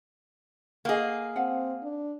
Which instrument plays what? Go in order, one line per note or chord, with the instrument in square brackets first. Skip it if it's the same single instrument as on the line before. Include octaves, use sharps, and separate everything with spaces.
[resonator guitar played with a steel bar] A#3 G#4 [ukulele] D#5 F#5
[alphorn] C4 [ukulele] F5 F#5
[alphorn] D4